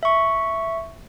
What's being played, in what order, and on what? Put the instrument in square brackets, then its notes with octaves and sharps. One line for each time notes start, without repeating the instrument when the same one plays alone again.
[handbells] E5 C#6